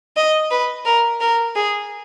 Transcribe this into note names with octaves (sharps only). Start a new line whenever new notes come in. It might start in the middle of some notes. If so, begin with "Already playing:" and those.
D#5
B4
A#4
A#4
G#4